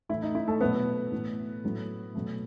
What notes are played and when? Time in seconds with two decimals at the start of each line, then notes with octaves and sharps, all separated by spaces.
0.09 A2 E3 A3 E4
0.23 D#4
0.35 E4
0.47 A3 A4
0.61 B2 F#3 A3 B3 B4
1.12 A2 E3 A3
1.64 A2 F#3 A3
2.15 B2 F#3 A3